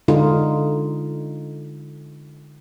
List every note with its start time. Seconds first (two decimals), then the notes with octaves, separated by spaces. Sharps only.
0.08 D3 G#3 D#4 F4